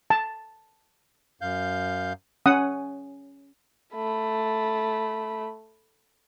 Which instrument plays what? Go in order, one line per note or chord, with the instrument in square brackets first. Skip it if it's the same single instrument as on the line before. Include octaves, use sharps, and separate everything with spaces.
[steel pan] A5
[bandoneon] F#2 F5 G6
[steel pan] C#4 F#5 D#6
[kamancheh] A3 B5